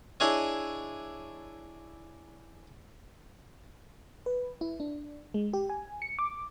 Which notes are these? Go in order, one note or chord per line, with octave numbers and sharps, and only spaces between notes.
D4 E4 G#4 C#5 D#5
B4
E4
D4
G#3
G4
G#5
C#7
D6